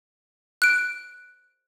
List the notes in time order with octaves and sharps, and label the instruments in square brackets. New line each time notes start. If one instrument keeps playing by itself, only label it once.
[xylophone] F#6 D7